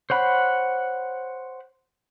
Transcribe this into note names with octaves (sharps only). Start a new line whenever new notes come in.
C5 C#5 F#5 B5